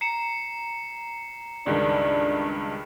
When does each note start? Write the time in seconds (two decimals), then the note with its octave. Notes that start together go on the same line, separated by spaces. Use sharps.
0.01 A#5 C7 C#7 E7
1.66 C#2 G2 D#3 D4